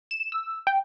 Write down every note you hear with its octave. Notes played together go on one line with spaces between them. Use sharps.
E7
E6
G5